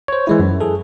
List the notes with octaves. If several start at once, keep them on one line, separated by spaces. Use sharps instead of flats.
C5 C#5
E3 G#3 E4
F#2
G#4 A4